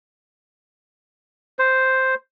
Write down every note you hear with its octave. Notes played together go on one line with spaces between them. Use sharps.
C5